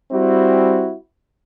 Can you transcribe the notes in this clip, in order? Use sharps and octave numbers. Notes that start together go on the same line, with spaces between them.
G3 C4 E4 F#4